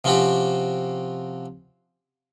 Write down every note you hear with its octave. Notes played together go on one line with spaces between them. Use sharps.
C3 F3 C4 C#4 F#4 G4